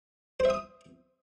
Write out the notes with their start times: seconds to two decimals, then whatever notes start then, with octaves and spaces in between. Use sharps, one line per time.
0.40 C5
0.45 E5
0.50 D#6